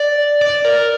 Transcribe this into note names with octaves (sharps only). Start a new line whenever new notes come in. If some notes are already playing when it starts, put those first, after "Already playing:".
Already playing: D5
D5
A#4